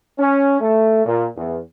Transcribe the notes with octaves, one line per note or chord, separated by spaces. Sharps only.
C#4
A3
A#2
E2